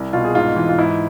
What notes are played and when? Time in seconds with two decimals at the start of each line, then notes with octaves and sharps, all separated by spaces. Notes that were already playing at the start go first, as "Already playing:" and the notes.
Already playing: C2
0.13 B2 F4
0.25 G#4
0.35 G#2 F4
0.56 E3
0.69 F4
0.78 G#2 E4